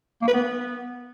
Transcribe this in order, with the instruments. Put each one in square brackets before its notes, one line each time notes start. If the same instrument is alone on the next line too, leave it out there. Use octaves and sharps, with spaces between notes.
[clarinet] A#3
B4
B3